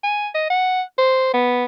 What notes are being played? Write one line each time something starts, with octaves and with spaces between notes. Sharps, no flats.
G#5
D#5
F#5
C5
B3